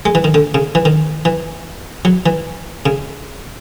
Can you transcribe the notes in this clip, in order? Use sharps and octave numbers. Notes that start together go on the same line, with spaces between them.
G#3
E3
D#3
D3
C#3
E3
D#3
E3
F#3
E3
C#3